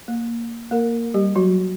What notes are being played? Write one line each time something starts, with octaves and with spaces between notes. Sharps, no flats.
A#3
A#3 A#4
G3 G4
F#3 F#4